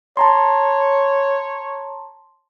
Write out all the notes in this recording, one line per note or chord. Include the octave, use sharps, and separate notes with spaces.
C#5 A5 A#5 C6